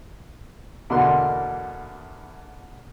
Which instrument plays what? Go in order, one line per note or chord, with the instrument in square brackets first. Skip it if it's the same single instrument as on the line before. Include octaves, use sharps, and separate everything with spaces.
[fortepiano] E2 B2 D3 A#3 D4 C6